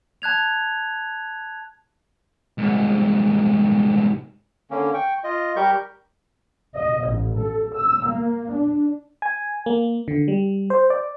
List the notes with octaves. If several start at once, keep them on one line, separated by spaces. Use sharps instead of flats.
A5 F#6 G#6 F7
C2 G#2
D3 A#3 C#4
G5 C#6
F4 D#5
G3 G4 A#4 C#6 G6
D#5
A1
A4
E6
A#3
D4
G#5
A#3
D3
G3
C5
D5